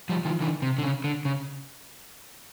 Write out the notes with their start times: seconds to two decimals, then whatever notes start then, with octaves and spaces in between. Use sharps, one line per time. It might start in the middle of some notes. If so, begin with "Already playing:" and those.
0.09 F3 G3
0.25 D#3 F3
0.40 D3 E3
0.62 C3
0.78 D3
0.83 C#3
1.04 D3
1.25 C#3